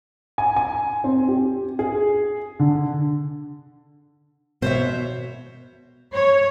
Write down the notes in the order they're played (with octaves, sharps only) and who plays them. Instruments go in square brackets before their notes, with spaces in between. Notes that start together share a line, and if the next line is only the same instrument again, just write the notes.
[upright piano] G#5
G#5
C4
G4
G#4
D3
[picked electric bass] B2 [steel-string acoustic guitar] C5 C#5 E5
[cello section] C#5